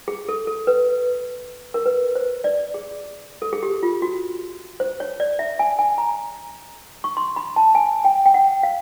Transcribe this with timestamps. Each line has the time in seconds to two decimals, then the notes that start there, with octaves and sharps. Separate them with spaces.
0.08 G#4
0.29 A4
0.47 A4
0.67 B4
1.74 A#4
1.86 B4
2.15 C5
2.44 D5
2.74 G#4
3.42 A4
3.53 G#4
3.63 G4
3.83 F4
4.02 F#4
4.80 C5
5.00 C#5
5.20 D5
5.39 E5
5.59 G#5
5.79 G#5
5.98 A#5
7.04 C#6
7.17 C6
7.36 B5
7.56 A5
7.75 G#5
8.05 G5
8.26 G5
8.34 F#5
8.63 F5